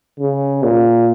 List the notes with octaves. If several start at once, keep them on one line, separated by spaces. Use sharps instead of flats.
C#3
A#2